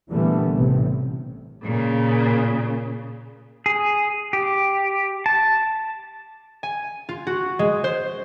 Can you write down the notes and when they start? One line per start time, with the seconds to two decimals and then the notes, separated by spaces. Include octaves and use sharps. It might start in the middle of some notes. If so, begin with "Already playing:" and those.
0.10 A#2 D3 E3 G3 A3 B3
0.52 A1 C3
1.65 A#2 C#3
3.66 G#4
4.33 G4
5.26 A5
6.63 G#5
7.09 F4
7.27 F#4
7.59 G#3
7.84 C5